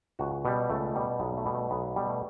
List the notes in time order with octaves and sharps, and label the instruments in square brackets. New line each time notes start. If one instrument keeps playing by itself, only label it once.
[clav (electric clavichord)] C#2 F#4
B2 G3
C#2 A3
B2 G3
B1 B3
A3
B2 G3
A3
B1 B3
B2 G3
A3